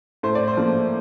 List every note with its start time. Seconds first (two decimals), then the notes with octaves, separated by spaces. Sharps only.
0.23 A2 C5
0.35 D5
0.48 C5
0.57 F3 A#3